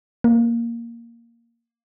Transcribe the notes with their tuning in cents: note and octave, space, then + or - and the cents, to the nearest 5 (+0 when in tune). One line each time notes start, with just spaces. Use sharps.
A#3 +0